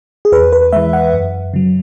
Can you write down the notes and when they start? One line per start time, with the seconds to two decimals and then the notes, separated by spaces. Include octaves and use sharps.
0.25 G#4
0.32 E2 B4
0.53 B4
0.73 E3 G#3 E5
0.93 F#5
1.13 F#2
1.54 C#3 F#3